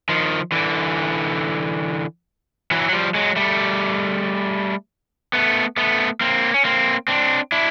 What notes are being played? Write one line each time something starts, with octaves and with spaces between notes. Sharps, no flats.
D#3 F3
D3 E3
E3 F#3
F#3
F3 G3
F#3 G#3
G3 A3
A3 B3
A3 B3
A#3 C4
C#4
A#3 C4
C4 D4
D4 E4